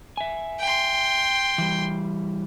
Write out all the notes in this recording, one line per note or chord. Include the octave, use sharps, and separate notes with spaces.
E5 G#5
G5 C6
E3 G3